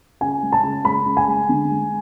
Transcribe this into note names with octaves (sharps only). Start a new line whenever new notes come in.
C#3 G#5
G#3
A5
C#3
G#3 B5
C#3
G#5
G#3
D3
G#3